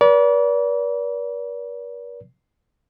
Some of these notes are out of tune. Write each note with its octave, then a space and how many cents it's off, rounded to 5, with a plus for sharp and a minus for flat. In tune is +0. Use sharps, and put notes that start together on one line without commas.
B4 -45 D5 -35